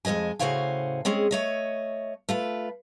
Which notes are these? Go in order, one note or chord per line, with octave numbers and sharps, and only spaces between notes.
F2 G#3 B4 D#5 G#5
A2 C#3 F#4 C5 F5 G#5
G#3 C4 C#4 G#4
A3 C#5 D#5
A3 F4 B4